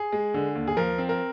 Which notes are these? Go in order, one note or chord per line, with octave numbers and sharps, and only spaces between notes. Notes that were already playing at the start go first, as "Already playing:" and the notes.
Already playing: G#4
G#3
D3
D#2
G#4
F3 A#4
C4
A#4